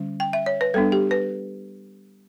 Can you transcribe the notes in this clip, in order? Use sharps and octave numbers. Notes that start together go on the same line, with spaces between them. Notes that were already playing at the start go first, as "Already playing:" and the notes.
Already playing: D3 G3 C#4
G5
E5
C#5
B4
G3 B3 D4 A4
G4
B4